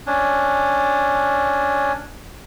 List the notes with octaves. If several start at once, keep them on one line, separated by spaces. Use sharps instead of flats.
C#4 D4